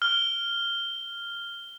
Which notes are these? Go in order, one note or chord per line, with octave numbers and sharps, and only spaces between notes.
F6 G7